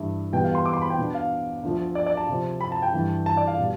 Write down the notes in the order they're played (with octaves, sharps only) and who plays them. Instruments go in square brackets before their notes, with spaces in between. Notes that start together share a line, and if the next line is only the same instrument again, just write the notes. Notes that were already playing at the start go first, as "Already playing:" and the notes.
Already playing: [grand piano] G2 E3 A3 D4 E5
E2 B2 G3 B3 G5
F5
C6
D6
C6
B5
G5
B2 B3 D4
F5
D2 D3 F3 A3
D5
D5
A5
C3 F3 C4
B5
A5
G5
G2 E3 A3 D4
A5
D5
F5
B2 G3